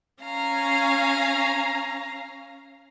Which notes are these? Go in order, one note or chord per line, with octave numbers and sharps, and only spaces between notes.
C#4 F5 A#5